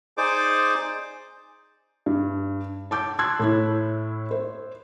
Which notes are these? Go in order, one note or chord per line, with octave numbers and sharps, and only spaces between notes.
D#4 G#4 C5 D5 D6
G2
A5 D6 G6
A5 C6 E6 F#6 G#6
A2 E4
C5